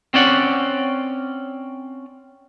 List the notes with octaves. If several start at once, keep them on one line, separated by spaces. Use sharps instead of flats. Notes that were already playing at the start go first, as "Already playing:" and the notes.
C4 C#4 D5 F#5